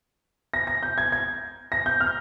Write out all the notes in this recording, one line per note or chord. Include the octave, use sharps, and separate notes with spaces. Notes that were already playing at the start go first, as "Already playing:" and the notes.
A#6
A#6
G6
G#6
G#6
A#6
G6
F6